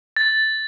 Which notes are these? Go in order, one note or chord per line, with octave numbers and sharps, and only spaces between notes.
A6